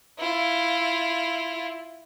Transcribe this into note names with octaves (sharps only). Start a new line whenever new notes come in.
E4 F4